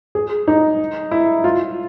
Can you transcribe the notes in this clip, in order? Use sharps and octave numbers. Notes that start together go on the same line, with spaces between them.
G#4
D#4
E4
F4